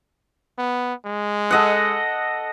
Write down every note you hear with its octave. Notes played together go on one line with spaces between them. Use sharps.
B3
G#3
A4 D#5 F#5